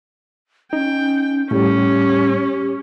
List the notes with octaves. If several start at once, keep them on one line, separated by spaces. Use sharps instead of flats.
C#4 D#4 G5
A2 G3 C#4 G4